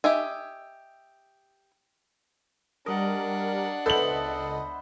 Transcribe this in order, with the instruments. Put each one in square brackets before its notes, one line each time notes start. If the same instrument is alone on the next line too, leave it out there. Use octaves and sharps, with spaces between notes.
[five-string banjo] G4 D#5 E5 G#5
[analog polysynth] G3 A#4 [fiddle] D4 F#5 [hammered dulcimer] D#5
[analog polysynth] C#2 D#5 [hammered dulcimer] B3 C5 E5 [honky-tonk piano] A4 F#7